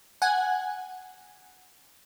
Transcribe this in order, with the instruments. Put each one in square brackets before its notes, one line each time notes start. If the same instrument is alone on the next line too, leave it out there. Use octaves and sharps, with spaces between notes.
[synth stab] F#5 G#5